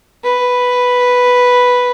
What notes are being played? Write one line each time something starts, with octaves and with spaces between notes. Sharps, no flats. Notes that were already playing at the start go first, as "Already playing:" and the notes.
B4